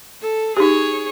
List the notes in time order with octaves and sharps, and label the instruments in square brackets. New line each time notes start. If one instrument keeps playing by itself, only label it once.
[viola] A4
[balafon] D#4 G4 [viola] G#4 C#5